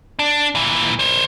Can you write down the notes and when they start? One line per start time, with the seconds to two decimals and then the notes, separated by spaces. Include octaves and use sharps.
0.19 D4
0.55 A#2 E3
0.99 C5 C#5